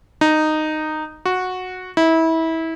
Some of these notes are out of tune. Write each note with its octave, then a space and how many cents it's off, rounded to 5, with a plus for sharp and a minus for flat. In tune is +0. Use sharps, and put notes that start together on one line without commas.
D#4 -10
F#4 -10
E4 -25